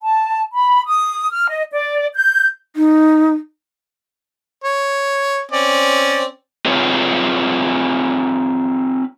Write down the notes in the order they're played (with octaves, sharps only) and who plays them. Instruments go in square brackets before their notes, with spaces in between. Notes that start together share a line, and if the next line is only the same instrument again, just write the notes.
[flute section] A5
B5
D#6
F6
D#5
D5
G6
[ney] D#4
[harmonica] C#5
C4 C#4 D5
[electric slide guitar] C4 F4 G#4 B4 C#5